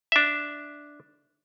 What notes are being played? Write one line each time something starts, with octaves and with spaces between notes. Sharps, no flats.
D4 E5